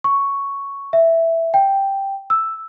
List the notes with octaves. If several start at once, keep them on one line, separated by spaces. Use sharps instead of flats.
C#6
E5
G5
E6